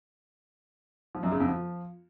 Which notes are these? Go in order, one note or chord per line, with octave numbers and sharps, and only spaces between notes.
F3
F#2
C#3
F2
F3